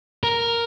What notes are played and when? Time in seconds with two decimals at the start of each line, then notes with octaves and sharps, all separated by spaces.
0.24 A#4